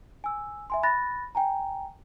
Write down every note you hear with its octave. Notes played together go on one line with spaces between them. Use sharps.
G#5 E6
E5 G#5 C6
B5 F#6 A6 A#6
G5 G#5 A#5